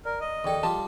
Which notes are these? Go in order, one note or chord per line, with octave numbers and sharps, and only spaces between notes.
A#4 D5
D#5
D#2 G#4 A4 D5 G5
G3 F4 G4 A5